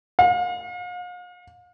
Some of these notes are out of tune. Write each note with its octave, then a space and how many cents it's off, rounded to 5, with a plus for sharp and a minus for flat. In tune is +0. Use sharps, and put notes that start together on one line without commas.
F5 +40